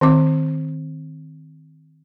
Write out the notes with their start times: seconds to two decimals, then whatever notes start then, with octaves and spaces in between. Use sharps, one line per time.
0.01 D#3 C4 D6